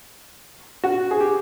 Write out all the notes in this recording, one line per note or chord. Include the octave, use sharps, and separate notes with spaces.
F#4
G#4
G4